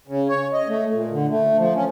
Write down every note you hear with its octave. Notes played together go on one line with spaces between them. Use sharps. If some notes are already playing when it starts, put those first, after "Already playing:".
C#3
C#5
D#5
A3
A#2
D3
A3
F3
C#4